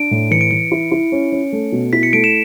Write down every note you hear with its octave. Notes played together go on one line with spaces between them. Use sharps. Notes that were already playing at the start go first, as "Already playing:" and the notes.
Already playing: D4 D7
A2
E3 C#7
D7
E3 C#7
E4
E4
C#4
C#4
A3
B2
E4 B6
C#7
A3 D7
E7